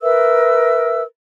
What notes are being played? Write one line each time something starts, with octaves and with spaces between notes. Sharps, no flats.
A#4 B4 E5 E6